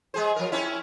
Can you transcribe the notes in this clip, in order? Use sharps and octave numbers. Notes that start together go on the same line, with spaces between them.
G#3 G#4 C5
F3 A#4
C4 C#4 E4